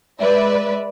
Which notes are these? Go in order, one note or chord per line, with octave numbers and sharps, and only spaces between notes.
G#3 B4 D5 E5